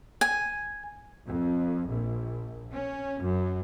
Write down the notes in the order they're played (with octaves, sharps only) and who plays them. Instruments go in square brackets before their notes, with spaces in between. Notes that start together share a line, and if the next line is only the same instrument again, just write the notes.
[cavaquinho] G#5
[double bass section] F2
A#1
C#4
F#2